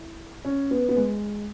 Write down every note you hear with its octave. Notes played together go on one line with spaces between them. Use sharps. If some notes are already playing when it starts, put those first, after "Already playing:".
Already playing: E4
C#4
B3
B3
G#3